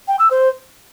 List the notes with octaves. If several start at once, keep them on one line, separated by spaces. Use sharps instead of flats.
G5
E6
C5